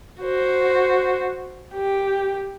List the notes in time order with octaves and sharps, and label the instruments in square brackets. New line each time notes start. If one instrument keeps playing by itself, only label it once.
[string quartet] F#4 C5
G4